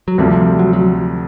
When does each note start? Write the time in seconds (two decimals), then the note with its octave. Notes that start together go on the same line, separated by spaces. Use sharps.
0.08 F#3
0.18 D2 C3 F3 G3
0.59 F#3
0.73 F#3